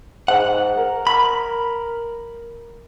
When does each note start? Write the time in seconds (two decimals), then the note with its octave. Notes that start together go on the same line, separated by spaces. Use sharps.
0.28 G#2 F#5
0.78 A#4
1.07 B5